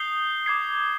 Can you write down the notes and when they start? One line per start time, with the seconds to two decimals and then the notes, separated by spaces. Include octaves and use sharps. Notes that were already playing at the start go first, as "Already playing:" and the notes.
Already playing: D#6 G6 C7 G7
0.46 D6 G#6 C7